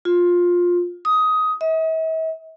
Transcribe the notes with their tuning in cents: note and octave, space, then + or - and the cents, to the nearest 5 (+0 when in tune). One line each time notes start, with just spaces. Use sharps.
F4 +15
D#6 +15
E5 -45